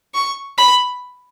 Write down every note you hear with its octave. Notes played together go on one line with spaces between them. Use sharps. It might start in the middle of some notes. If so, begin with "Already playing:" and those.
C#6
B5